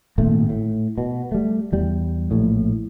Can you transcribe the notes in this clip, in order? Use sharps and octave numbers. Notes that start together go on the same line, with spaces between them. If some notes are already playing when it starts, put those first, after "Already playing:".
G#1 A#2 A3
A2
B2
G3 A3
E2 G3
A#1 A2